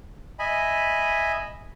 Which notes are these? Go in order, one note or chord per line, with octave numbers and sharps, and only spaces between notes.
D#5 E5 G#5 B5